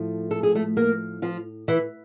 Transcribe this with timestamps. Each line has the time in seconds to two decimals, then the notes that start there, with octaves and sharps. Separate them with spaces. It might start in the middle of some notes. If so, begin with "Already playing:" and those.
Already playing: A2 F3 A3
0.31 A4
0.43 G#4
0.55 A3 A4
0.77 A#3 A#4
1.22 F3 F4
1.68 E3 E4